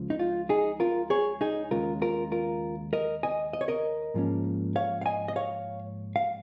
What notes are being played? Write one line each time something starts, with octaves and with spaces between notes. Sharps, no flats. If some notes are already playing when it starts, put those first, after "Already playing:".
Already playing: C#2 C#3 F3
D#4
F4
D#4 G#4
F4 A#4
G#4 C#5
D#4 G#4
D#2 C#3 G#3 F4 A#4
F4 A#4
F4 A#4
A#4 D#5
D#5 G#5
D#5
C#5
A#4 D#5
G#2 F3 A#3 C#4
C#5 F5
F5
D#5 G#5
D#5
C#5 F5
F5